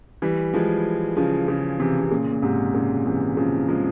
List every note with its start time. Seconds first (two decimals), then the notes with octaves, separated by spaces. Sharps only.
0.22 E3 G3
0.53 F3 G#3
1.17 C#3 F3
1.48 C#3 F3
1.80 C3 E3
2.01 C3
2.11 A#2 C#3
2.31 A#2
2.42 G#2 C3
2.74 A#2 C#3
3.06 C3 E3
3.37 C#3 F3
3.68 F3 G#3